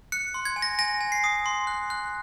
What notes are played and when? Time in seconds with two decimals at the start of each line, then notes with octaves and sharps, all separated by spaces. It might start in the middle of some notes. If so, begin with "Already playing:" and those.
0.12 F#6 C#7
0.34 C6
0.45 G#6
0.56 G#5
0.62 A#6
0.79 G#5 A#6
1.01 G#5
1.12 C7
1.24 D#6
1.46 C6
1.67 F#6
1.90 F#6